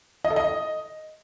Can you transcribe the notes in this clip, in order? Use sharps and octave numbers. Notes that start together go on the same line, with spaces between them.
D#5
A4
D#5